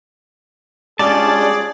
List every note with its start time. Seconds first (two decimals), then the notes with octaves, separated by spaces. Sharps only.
0.99 G#3 C#4 D4 F4 G4 G#4 D5 A5